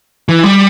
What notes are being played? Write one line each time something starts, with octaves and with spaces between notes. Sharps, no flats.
E3
G3